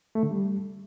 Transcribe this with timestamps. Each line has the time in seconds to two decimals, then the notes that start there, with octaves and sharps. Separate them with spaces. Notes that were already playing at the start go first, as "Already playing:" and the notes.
0.15 A3
0.23 D3
0.30 G3